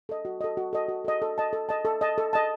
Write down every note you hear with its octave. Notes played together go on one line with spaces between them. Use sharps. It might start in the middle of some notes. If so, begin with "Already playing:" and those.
A4 D#5
F#4
A4 D#5
F#4
A4 D#5
F#4
A4 D#5
A4
D#5 A5
A4
D#5 A5
A4
D#5 A5
A4
D#5 A5